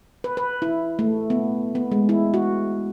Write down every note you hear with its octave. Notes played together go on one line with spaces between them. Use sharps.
B4
B4
E4
A3
B3
B3
G#3
E4
F#4